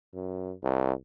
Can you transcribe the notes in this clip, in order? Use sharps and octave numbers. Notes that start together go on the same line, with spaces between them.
F#2
C2